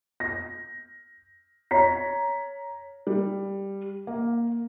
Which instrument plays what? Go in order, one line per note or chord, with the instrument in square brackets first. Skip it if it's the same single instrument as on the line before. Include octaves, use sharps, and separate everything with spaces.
[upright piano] A#6
C#5 A#5 B6
[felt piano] G3
A#3